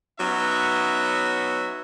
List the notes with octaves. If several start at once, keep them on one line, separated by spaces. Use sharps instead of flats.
F#3 B3 C#4 D#4 E5